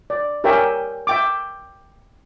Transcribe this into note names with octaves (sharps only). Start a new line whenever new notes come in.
D5
G4 A#4 C#5 E5 G5 G#5
E5 G5 D6